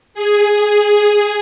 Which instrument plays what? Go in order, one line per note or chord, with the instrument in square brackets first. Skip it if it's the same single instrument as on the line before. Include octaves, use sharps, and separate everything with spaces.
[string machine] G#4